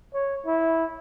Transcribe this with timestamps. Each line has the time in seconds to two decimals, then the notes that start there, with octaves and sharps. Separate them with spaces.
0.14 C#5
0.46 E4